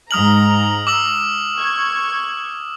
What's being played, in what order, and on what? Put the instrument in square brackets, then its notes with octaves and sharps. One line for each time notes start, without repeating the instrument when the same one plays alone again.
[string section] G#2 A#5 [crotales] D#6 F6 F#7
[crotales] D6 E6 F#7
[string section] C#6 G#6